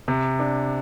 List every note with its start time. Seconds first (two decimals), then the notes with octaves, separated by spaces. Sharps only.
0.08 C3
0.39 D4